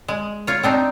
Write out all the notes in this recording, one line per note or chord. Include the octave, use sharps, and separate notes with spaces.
G#3
F4 C#5
C4 D4 D#4